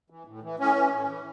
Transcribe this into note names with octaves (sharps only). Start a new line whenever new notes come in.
E3
A2
E3
A2 C#4
E3
A2
E3